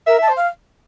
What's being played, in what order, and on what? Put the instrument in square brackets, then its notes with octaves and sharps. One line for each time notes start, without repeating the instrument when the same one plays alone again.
[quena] A#4 [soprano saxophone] E5
[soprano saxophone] E5 [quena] A5
[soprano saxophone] C5
[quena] F5